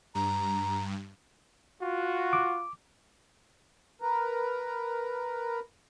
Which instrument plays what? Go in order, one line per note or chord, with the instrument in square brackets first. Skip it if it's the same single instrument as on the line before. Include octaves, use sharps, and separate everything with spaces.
[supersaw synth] G2 [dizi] A#5
[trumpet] F4 [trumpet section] F#4
[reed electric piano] D6
[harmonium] A#4 B4 A#5